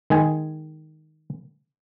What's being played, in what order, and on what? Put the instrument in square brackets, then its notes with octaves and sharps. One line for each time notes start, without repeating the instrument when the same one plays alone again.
[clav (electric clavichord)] D#3 G#3 G#4 G#5